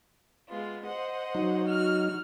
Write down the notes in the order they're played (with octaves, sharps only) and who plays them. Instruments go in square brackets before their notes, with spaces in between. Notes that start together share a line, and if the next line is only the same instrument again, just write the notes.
[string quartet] G#3 B3 F4
C5 D#5 F#5
[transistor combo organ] F#3 D#4
[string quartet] F#4 F6